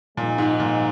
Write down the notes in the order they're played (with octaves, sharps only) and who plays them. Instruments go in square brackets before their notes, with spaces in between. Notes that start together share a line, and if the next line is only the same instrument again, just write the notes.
[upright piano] A#2 [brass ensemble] F3 G#3 C4 D#4
[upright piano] G#2
A#2